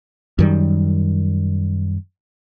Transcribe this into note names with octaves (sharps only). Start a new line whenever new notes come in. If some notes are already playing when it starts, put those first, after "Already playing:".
F#2 D#3 G3